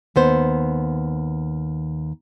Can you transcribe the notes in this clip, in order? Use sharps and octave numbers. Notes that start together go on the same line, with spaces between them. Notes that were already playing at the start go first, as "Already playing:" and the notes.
D#2 B3 C5